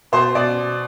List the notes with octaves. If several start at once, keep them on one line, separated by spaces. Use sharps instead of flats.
B2 C5
B2 D5